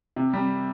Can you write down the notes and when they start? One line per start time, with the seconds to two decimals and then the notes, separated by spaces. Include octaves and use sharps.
0.16 C3
0.33 G3